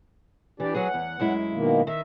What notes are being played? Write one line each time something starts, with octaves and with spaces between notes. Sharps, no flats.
E3 D4 G4 D5
F#3 G#4 F#5
E2
F#2 G#3 E4
B2 D#3 A#3
D#3 E5